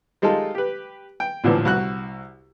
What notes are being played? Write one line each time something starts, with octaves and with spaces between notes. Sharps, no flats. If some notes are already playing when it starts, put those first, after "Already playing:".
G3 G#3 D#4 F4 A4
G4 B4
G5
A1 A#2 D3 E3 F3
C2 F#4 F#6